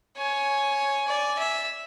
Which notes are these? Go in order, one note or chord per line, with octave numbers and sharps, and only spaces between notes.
C#5 G#5
D5
E5